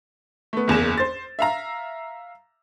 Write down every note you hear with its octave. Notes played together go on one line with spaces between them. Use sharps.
A3 B3
F#1 E2 A#3 E7
C5 A6
E5 F5 A#5